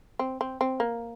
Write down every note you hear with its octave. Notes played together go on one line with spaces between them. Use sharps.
C4
C4
C4
A#3